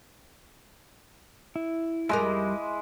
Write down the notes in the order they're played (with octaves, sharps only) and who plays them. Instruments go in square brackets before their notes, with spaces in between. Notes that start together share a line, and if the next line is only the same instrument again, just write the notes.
[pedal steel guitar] E4
[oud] F2 G3 A#4 [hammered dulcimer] G#3 [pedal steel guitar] E4 D#5 D6